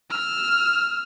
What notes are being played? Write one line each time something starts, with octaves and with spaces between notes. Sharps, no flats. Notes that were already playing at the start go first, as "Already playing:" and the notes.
E6 F6